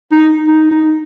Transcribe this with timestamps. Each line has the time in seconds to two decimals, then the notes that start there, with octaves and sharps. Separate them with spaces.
0.12 D#4
0.48 D#4
0.71 D#4